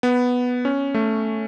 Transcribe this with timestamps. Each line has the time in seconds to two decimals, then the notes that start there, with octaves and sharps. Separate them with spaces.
0.03 B3
0.65 C#4
0.94 A3